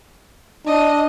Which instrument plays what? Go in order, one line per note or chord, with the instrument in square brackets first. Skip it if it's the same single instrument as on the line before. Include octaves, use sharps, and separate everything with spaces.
[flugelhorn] D4 [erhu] D#5